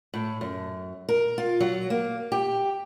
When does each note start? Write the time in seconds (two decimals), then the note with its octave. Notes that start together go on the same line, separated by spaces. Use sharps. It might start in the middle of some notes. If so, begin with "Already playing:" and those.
0.14 A2
0.41 F#2
1.09 A#4
1.38 F4
1.60 F#3
1.90 A#3
2.32 G4